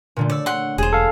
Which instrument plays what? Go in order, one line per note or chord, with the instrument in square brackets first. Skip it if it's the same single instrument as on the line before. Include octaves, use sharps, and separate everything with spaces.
[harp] A#2 D3 A3
[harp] C#5 E6 [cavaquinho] D5
[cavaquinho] F#5 C6
[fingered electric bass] E1 [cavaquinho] G#4 C5
[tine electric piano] A4 F5